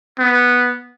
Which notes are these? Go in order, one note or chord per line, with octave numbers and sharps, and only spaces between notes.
B3